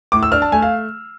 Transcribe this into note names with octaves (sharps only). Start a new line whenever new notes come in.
A2 D6
E6
D4 F6
A5
A3 G#5
F5